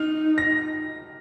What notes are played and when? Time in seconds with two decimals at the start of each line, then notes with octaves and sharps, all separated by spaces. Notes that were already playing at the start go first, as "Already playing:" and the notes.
Already playing: D#4 F6
0.38 A#6